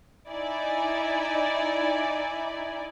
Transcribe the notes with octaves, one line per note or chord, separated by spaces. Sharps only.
D#4 E4 D5 G#5